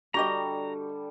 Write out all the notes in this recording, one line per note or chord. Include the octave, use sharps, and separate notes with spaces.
D3 G3 F#4 G4 D#5 A#5